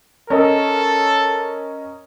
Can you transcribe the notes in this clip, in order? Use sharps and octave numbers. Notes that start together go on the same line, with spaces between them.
C#4 A4 A#4 D#5